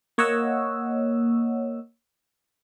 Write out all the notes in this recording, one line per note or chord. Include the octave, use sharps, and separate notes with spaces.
A#3 C#5 D#5 F#5 E6